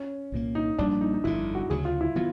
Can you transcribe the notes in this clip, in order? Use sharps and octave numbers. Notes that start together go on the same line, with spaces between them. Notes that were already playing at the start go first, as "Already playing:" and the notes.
Already playing: C#4
C2 A#2 F3 A#3
D#4
A#1 A#2 G3 A#3 D4
D#4
D#4
G1 F2 D3 E4
F#4
D2 C#3 F#3 G#4
F4
E4
D#3 F#3 B3 F4